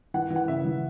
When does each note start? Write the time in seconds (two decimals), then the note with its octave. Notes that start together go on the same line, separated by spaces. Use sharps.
0.14 E3 F#5
0.30 E3
0.36 F#5
0.48 C#3 E5
0.65 E3